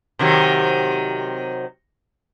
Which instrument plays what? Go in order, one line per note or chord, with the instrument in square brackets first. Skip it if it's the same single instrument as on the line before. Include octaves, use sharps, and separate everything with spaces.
[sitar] C3 D#3 F#3